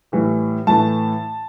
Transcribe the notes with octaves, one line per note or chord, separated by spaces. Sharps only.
A2 E3 G3
A2 E3 A3 A5